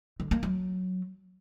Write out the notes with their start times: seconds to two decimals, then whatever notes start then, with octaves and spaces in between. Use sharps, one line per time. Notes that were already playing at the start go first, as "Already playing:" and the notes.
0.20 D3
0.31 A#3
0.43 F#3